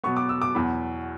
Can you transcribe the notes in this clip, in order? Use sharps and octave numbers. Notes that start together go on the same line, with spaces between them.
B2 F#3 B3 C#6
D6
E6
D6
E2 B2 F#3 B5